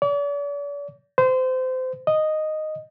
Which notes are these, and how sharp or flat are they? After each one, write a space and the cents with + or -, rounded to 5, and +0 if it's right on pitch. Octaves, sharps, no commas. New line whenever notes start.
D5 -45
C5 -25
D#5 -5